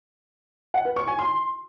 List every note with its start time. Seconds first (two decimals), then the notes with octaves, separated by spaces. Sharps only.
0.74 F#5
0.85 B4
0.96 C#6
1.08 G#5
1.19 C6